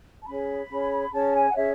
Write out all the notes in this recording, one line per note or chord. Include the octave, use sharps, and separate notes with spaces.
A5
C#4 G#4 C#5 B5
C#4 G#4 C#5
C#4 G#4 C#5 A5
G#5
F#5
C#4 G#4 C#5 E5